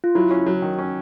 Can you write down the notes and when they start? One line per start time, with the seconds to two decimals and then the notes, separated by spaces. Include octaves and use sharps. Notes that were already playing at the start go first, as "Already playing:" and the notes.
0.04 F4
0.15 F#3 E4
0.31 C#4
0.47 F#3
0.62 D#3
0.78 C#4